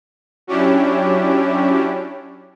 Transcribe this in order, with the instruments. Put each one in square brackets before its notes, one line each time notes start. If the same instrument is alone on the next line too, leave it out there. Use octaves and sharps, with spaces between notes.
[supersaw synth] F#3 C#4 D4 E4 G4